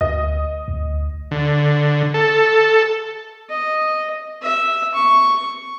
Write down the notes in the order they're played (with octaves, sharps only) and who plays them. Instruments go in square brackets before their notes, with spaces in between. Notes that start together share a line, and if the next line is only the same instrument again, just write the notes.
[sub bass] D2 [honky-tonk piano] D#5
[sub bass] D2
[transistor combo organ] D3
A4
[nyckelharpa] D#5
E5
C#6